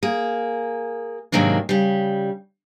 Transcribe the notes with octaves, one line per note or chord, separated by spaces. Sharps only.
A#3 G#4
G#2 C3 D#3 F#3 A#3 D4
C#3 G3